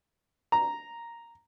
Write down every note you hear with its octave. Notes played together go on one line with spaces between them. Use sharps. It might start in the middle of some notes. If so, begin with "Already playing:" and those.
A#5